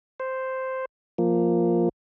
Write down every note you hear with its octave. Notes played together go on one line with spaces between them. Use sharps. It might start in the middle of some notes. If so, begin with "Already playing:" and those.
C5
F3 A#3